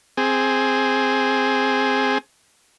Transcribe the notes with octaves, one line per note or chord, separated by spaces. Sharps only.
C4 G#4